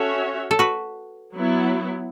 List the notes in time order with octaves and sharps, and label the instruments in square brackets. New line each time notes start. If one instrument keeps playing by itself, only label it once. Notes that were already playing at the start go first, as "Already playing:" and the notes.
Already playing: [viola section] C#4 F#4 C#5 E5 [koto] A4
[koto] A4
F#4 B4
[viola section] F#3 B3 E4